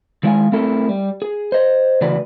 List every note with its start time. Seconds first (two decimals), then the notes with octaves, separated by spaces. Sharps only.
0.23 D#3 G#3 E4 D5 F5 G#5
0.52 A3 C4 E4 A4 A#4
0.89 G3
1.22 G#4
1.52 C5 D#5
2.01 D2 C#3 E3 F#4 B4 D5